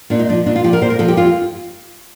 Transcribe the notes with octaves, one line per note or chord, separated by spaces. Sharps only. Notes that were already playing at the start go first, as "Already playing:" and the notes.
A#2 D4
D#4
F3 D4
A#2 D4
F4
F3 G4
A#4
A#2 C5
A#4
F3 A4
G4
F2 F4